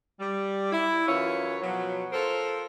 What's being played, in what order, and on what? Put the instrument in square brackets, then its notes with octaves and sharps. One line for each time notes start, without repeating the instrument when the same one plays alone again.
[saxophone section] G3
E4
F#2 E3 C#4 F4 C#5
B2 F3 F#3
F4 A4 A#4 C5